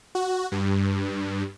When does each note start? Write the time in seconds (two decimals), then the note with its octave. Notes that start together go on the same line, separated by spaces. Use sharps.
0.15 F#4
0.52 G2